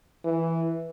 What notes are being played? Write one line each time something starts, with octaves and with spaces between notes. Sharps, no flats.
E3